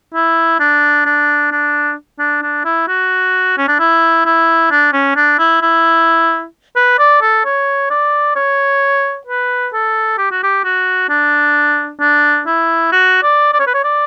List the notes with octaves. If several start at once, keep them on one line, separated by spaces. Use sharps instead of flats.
E4
D4
D4
D4
D4
D4
E4
F#4
C#4
D4
E4
E4
D4
C#4
D4
E4
E4
B4
D5
A4
C#5
D5
C#5
B4
A4
G4
F#4
G4
F#4
D4
D4
E4
F#4
D5
D5
C#5
B4
C#5
D5